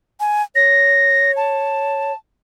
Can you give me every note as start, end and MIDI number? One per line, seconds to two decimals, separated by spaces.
0.20 0.42 80
0.55 2.12 73
0.55 1.32 94
1.36 2.14 81